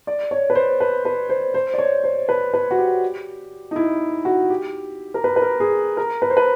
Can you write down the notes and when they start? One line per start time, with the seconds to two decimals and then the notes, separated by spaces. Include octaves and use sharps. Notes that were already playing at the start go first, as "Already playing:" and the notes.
0.07 D5
0.31 C#5
0.50 B4
0.55 C5
0.80 B4
1.05 B4
1.29 C5
1.54 C5
1.74 D5
1.78 C#5
2.04 C5
2.29 B4
2.54 B4
2.71 F#4
2.78 G4
3.71 D#4
3.76 E4
4.25 F#4
4.50 G4
5.14 A#4
5.24 B4
5.36 B4
5.42 A#4
5.60 G#4
5.97 A#4
6.22 B4
6.30 C5
6.37 B4